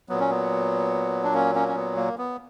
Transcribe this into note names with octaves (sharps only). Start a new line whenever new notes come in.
A#2 F#3 B3
C#4
B3
D4
A#3 C#4
A#3 C#4
C#4
B3
A#3
B3